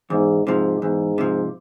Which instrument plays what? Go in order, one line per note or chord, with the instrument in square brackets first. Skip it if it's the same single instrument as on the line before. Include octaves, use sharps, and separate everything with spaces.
[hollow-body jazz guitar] E2 [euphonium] G#2
[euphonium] G#2 [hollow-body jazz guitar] C3 F3
[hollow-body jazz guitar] E2 [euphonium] G#2
[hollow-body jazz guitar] C3 F3